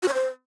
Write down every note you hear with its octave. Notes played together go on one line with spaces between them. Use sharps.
F#4
C#5
C5